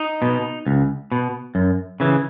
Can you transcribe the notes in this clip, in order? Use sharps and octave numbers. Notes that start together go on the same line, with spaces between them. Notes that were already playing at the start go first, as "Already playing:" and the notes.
Already playing: D#4
B2
C#2
B2
F#2
C#3 E3